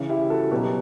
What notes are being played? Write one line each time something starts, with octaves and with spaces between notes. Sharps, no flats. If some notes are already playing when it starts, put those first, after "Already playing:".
Already playing: C#3 E3
E4 G4
F#4 A4
B2 F#3 G4 B4